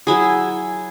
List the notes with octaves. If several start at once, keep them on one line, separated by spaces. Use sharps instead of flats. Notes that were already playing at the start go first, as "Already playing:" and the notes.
F#3 E4 G#4